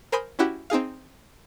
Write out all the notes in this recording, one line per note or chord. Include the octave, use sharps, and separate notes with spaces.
A#4 C5 G#5 B5 D#6 G6
C#4 E4 F#4 G4
C4 D#4 G#4 F5